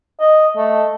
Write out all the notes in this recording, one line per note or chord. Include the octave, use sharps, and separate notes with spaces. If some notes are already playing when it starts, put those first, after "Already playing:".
D#5
A3